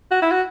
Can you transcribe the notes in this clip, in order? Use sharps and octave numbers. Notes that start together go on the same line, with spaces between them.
F#4
E4
F#4